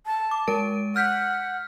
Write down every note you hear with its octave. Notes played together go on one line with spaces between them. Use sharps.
A5
D6
G#3 A#4 D7
F#5 F6 G6 B6